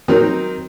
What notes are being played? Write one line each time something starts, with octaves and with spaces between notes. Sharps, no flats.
D#3 F#3 C4 D#4